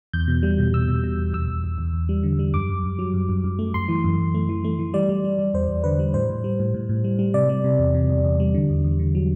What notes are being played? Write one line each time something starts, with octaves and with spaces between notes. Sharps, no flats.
E2 G6
B2
G3
B2
B2 E6
B2
B2
E2
E2 E6
E2
E2
E2
E2
G3
D3
G3
F#2 D6
F#2
F#2
F#3
F#2
F#2
F#2
A3
F#2 C6
E3
F#2
F#2
A3
E3
A3
E3
G3 D5
G3
G3
G3
E2 C5
E2
D3 B4
G3
A2 C5
A2
G3
A2
A2
A2
G3
G3
C3 D5
G3
C3
E2
C3
E2
E2
G3
D3
E2
E2
D3
F#3